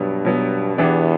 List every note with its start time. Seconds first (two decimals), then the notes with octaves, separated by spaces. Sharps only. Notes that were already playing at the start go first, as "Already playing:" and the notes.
Already playing: G2 B2 F#3 B3
0.25 B2 F#3 B3
0.78 E2 E3 B3 D4 G4